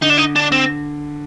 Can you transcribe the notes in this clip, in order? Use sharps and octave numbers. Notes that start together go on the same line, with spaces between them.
D3 D#4
D4
D#4
D4
C4